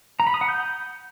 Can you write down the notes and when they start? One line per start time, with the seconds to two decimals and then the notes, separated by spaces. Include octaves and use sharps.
0.20 A#5
0.27 B5
0.34 D#6
0.41 F#5
0.48 G6